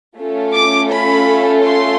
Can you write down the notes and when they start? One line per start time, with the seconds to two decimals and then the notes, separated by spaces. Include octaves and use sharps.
0.17 A3 C#4 F4 A4
0.53 D6
0.91 B5
1.64 C6